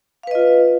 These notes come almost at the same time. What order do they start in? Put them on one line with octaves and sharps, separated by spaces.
F5 B4 D#5 F4